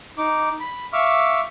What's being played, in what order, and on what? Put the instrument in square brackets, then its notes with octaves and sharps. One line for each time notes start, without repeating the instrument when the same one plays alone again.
[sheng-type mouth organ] D#4 D6
B5
E5 F5 C#6 D6 E6 F6